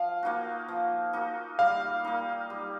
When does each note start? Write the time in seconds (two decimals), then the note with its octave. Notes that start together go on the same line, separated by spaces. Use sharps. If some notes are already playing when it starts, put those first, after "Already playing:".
Already playing: F3 F5
0.23 A#3 D#4 F#4
0.69 F3
1.13 A#3 D#4 F#4
1.59 G3 F5
2.05 A#3 D#4
2.50 G3